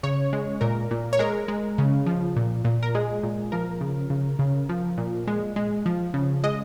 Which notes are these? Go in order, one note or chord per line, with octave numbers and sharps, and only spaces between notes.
C#3 C#5
G#3
A#2 A#4
A#2
C#5
G#3 A#4
G#3
C#3
F3
A#2
A#2
A#4
G#3 G#4
A#2
F3 A#4
C#3
C#3
C#3
F3
A#2
G#3
G#3
F3
C#3
G#3 D#5